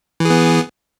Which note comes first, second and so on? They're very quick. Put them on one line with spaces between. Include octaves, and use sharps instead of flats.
E3 G#4 B3